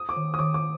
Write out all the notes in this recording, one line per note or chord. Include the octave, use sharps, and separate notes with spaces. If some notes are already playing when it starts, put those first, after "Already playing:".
Already playing: D#6
D6
D#3
D#6
D#3 D6
D6